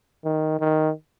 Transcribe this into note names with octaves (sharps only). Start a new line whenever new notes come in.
D#3
D#3